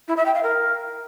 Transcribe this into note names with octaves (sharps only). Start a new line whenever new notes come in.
E4
E5
G5
F5
A#4